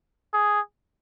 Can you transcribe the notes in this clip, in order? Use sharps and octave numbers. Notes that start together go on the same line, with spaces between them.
G#4